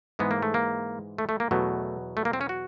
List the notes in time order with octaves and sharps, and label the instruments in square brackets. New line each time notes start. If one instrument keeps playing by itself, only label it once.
[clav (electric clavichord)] G#2 E3 G#3 B3
A#3
A3
A#3
A3
A3
A#3
E2 B2 F#3 A3
A3
A#3
C4
C#4
F#4